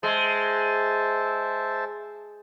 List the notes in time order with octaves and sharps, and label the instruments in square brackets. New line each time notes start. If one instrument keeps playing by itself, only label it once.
[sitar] G#3 [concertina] C5 E5 A5